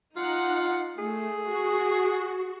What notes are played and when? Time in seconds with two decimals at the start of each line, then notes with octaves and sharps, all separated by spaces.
0.16 D#4 F4 F#5
0.98 A3 G#4
1.49 F#4